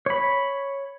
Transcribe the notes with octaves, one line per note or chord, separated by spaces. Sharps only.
C#5 B5